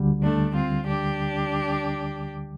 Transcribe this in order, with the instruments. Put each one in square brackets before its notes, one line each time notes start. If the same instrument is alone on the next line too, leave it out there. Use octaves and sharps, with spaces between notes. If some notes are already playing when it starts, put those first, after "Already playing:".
Already playing: [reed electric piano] D2 D3 G3
[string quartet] A3 D4
C4 F4
D4 G4